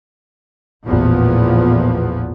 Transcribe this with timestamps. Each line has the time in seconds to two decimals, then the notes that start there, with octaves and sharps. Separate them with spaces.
0.86 A1 E2 A#2 F3 B3